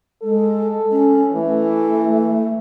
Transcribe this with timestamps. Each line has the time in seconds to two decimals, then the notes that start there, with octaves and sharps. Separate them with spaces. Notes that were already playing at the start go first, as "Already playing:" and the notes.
0.23 G#3 A4
0.91 C#4
1.33 E3 A3